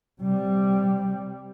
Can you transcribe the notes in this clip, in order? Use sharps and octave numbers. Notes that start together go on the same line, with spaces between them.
C3 G3